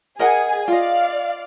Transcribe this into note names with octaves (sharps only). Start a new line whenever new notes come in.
G#4 A#4 D#5 F#5 G#5
F4 D5 D#5 F5